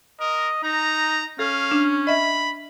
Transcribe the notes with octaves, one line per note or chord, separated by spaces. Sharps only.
A#4 D#5
D#4 A#5
C#4 A4 F5
D4
D#5 E5 B5